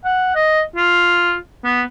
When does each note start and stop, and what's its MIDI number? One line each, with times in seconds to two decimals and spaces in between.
0.05 0.31 78
0.35 0.62 75
0.76 1.35 65
1.64 1.82 59